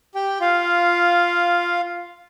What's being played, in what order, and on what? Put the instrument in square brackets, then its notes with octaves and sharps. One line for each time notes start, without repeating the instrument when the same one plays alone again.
[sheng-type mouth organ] G4 G5
F4 F5